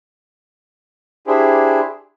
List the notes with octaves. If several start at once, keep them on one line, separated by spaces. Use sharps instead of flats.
D4 E4 G4 G#4 C5